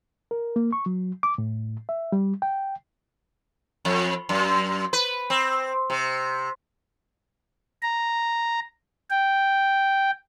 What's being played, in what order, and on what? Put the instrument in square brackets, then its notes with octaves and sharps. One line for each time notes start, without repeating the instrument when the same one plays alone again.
[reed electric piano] A#4
A#3
C#6
F#3
D6
A2
E5
G3
G5
[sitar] F2
F#2
B4
C4
C3
[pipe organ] A#5
G5